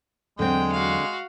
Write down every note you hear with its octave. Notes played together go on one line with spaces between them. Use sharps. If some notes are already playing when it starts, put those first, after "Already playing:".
E2 D3 F#3 G#3 C4 G5
F#4 F5